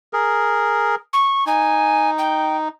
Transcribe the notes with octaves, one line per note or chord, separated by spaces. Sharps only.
G#4 A#4
C#6
D#4 G#5
G5